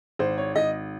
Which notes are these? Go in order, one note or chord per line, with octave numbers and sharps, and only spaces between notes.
G#1 C5
C#5
G#1 D#5